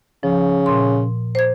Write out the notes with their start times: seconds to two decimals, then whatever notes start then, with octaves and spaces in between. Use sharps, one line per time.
0.23 C#3 F3
0.66 A#2 C6
1.35 C5 G#6